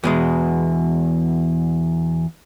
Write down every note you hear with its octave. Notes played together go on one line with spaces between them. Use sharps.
E2 B2 G#3